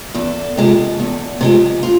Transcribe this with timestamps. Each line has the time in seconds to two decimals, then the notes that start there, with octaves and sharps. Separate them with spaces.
0.14 E2 A4
0.57 C3 F3 G#3
1.00 E2
1.41 C3 F3 G#3
1.83 F4